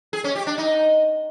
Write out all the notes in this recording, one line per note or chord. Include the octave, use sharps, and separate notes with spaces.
G#4
C#4
G4
D4
D#4